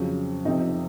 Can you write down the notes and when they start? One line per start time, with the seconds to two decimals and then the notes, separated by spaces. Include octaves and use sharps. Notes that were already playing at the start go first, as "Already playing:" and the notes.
Already playing: F2 C#3 F#3
0.45 F1 F2 C3 D#4